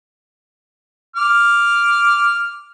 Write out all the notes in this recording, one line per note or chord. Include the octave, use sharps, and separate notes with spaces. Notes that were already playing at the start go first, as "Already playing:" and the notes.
D6 F6